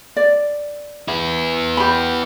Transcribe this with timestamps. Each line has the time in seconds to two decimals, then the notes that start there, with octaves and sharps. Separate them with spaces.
0.17 D5
1.08 B3 E4
1.77 G4 B5